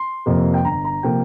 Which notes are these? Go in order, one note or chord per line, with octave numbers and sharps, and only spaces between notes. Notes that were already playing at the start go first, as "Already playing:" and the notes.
Already playing: C6
F2 C3 F3 A#3
G5
G1 A#5
A#5
C3 F3 A#3 G5